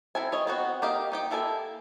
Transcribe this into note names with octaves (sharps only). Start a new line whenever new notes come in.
C4 E4 A4 G#5
G#4 C#5 D#5
B3 C4 F#4
A#3 G4 D#5 F5
D#4 G4 G5
A#3 E4 A4 A#4 G#5